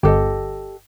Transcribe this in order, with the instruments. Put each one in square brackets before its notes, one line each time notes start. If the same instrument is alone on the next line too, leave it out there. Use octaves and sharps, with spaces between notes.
[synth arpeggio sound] G1 [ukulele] G4 A4 D#5